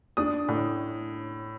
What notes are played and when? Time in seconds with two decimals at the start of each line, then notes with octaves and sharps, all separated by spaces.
0.17 D4 D#6
0.48 A2